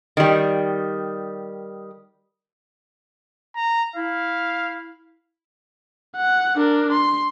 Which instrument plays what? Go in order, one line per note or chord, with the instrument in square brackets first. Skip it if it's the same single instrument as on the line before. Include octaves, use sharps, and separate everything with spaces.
[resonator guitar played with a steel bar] D#3 G3
[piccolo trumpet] A#5
[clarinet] E4 [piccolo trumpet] F5
[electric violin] F#5
D4 A#4
C6